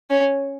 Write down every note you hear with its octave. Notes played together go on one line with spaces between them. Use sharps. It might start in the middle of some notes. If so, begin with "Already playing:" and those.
C#4